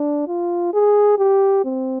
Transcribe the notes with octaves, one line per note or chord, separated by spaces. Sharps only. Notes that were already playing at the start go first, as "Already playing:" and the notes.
Already playing: D4
F4
G#4
G4
C4